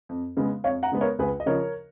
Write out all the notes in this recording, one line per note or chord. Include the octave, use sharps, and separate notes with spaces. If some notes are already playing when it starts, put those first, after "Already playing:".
F2
C#3 G#3 B3
F2 C#5 F5
F#5 A#5
C#3 G#3 B3
A#4 C#5
C#2 G#4 B4
D#5
C#3 F3 A#4 C#5